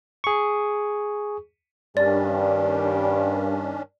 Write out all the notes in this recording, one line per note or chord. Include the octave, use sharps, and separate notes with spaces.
G#4 C#6
G2 D#3 G3 C#4 D4 D5